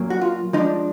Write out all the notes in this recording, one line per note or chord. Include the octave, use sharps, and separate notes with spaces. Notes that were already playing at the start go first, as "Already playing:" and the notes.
Already playing: A#2 F#3 A#3
F#4
F4
F3 G#3 D4 D#4